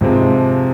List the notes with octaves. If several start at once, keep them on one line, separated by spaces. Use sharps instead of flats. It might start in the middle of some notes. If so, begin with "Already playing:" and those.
F2 G#2 C3 F3 G#3 C4